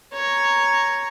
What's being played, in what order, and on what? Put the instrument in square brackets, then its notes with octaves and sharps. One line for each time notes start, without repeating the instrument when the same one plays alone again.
[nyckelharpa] C#5 A#5